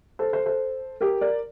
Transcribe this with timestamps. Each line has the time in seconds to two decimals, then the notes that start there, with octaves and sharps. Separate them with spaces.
0.19 A4 C5
0.33 A4 C5
0.46 A4 C5
1.01 G4 A#4
1.21 A#4 D5